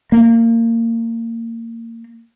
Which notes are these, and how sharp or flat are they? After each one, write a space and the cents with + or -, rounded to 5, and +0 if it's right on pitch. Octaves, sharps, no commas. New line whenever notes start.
A#3 -25